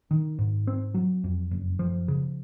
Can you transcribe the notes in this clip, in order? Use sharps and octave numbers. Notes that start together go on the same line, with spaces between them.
D#3
G#2
C4
F#3
F2
F#1
F3
C#3